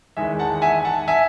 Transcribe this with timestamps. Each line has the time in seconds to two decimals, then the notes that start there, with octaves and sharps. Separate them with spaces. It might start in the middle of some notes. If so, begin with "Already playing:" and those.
0.17 E2 D#3 G#3 E5 G#5
0.39 F#5 A5
0.62 E5 G#5
0.85 F#5 A5
1.08 E5 G#5